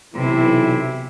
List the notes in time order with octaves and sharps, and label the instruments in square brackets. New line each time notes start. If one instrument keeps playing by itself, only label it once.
[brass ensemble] B1 E3 E4 [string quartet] C3